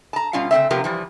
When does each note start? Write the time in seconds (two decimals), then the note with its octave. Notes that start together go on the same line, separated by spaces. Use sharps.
0.13 A5 A#5
0.33 B2 G3 C#4 F4 F5
0.51 C#3 A3 C4 E5
0.71 C3 F3 B3 F4 G4 A#4
0.84 E3 F3 G3